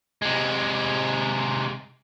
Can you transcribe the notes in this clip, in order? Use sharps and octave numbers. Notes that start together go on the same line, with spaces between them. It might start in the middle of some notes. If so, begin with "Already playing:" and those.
C3 G#3